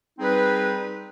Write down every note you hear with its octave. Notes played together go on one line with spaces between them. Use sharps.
G3 C4 D#4 G#4 B4